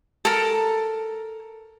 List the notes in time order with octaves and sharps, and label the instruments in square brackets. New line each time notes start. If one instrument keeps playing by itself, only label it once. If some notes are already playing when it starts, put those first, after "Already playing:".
[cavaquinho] A4 A#4